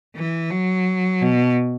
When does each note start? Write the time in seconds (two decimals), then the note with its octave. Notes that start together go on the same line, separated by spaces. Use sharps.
0.16 E3
0.51 F#3
1.21 B2